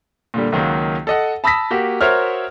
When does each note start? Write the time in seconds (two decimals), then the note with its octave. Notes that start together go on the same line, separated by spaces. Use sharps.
0.34 A#2 D3 G3
0.52 C#2 D#3 F#3 A#3
1.07 A4 D#5 F#5
1.44 A5 B5 D#6 E6 A#6 B6
1.71 A#3 F#4 G4
2.01 F#4 A#4 C5 C#5 E5 F6